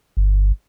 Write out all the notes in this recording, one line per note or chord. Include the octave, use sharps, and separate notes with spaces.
G1